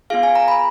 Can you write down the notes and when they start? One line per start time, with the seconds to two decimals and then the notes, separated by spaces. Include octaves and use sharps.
0.10 B3 F4 G#4 F5
0.23 G#5
0.35 A#5
0.48 B5